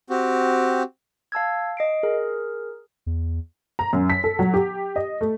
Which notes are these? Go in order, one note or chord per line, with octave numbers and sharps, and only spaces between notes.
C4 F#4 G4
F5 A5 E6 G#6
D#5 C7 D7
G#4 A#4
E2
A#5
F#2
B6
A4
F#3
G4
D#5
A3